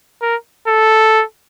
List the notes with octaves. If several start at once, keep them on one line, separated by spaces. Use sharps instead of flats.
A#4
A4